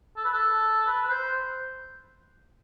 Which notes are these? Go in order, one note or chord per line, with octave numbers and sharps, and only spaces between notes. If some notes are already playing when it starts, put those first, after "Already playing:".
A4
B4
A4
B4
B4
C5